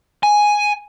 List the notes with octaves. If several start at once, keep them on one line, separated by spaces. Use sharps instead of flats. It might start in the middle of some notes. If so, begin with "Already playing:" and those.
G#5